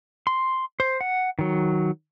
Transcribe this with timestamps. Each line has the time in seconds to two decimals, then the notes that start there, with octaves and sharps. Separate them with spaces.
0.27 C6
0.80 C5
1.01 F#5
1.39 D#3 F#3